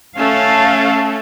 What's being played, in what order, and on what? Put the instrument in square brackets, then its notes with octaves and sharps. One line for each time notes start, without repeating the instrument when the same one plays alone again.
[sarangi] A3 [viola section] C#4 A4 A5 [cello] F5